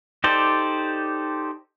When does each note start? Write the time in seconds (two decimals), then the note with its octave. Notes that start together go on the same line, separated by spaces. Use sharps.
0.24 D#4 G4 A4 C5 D5